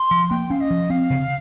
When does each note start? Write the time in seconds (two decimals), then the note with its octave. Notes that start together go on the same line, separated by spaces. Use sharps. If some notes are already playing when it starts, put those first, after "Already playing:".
Already playing: C6
0.11 F3
0.31 A#3 G5
0.50 C#4 F5
0.61 D#5
0.70 F3
0.90 C4 F5
1.10 C#3